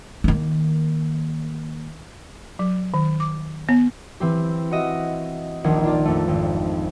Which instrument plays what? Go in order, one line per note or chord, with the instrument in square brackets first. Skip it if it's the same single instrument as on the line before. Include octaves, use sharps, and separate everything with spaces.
[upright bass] D#3 A#3
[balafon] F#3
D#3
D6
B3
[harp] E3 C4 G4
F#4 D#5 E5
D#1 A#1 D#3 D4 F4 G#6
D4 F4 D5
F2 A3
G#1